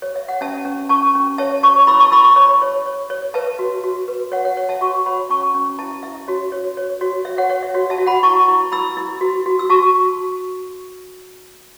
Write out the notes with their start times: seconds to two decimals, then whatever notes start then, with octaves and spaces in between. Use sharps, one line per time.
0.02 C#5
0.16 E5
0.29 F#5
0.41 C#4 E5 A5
0.65 C#4
0.89 C#4 A5 C#6
1.15 C#4
1.38 C#5 E5 A5
1.63 C#5 A5 C#6
1.87 E4 B5 E6
2.00 A5 C#6
2.12 E4 B5 E6
2.24 A5 C#6
2.36 C#5
2.62 C#5
2.86 C#5
3.10 C#5
3.34 B4 E5 A5
3.59 F#4
3.84 F#4
4.08 B4
4.32 C#5 F#5
4.45 C#5 F#5
4.57 C#5 F#5
4.69 E5 A5
4.81 F#4 A5 C#6
5.06 C#5 F#5 B5
5.30 C#4 A5 C#6
5.54 C#4
5.79 E4 E5 A5
6.03 E4 E5
6.28 F#4 C#5
6.52 C#5
6.77 C#5
7.01 F#4 C#5
7.25 C#5 E5
7.38 C#5 F#5
7.49 C#5 F#5
7.63 E5
7.75 F#4 C#5
7.90 E5 A5
7.98 F#4
8.06 F#5 B5
8.23 E4 A5 C#6
8.48 E4
8.72 E4 B5 E6
8.97 E4
9.21 F#4
9.46 F#4
9.59 E6
9.70 F#4 A5 C#6